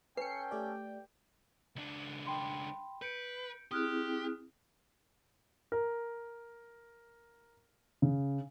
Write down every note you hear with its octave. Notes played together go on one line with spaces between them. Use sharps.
C#4 A4 B4 G5 C7 C#7
A3 G4 D5
C#2 D4
G5 B5 C6
B4 G6 C#7 D7
C4 E4 G4 G#4 D#6 F6 F#6
A#4
C#3